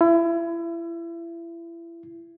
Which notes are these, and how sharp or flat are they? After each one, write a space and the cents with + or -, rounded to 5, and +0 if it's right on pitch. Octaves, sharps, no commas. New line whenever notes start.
E4 +30